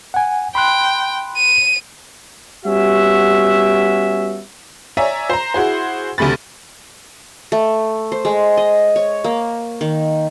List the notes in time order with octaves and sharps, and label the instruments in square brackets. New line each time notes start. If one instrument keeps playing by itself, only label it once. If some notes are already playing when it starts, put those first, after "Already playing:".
[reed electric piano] F#5 G#5
[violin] G5 [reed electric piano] B5 C6 F#6
[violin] D#7
[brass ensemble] G3 B3 C#4 F#4 E5
[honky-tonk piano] C#5 D5 E5 G#5 A#5
C5 A#5
E4 F#4 G#4 C5
D2 C3 A3 B5 A6
[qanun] A3
C5
G#3
D#5
C#5
A#3
D#3